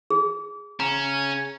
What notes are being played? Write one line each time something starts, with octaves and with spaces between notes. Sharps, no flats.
G#4
C#3 C#4 A#5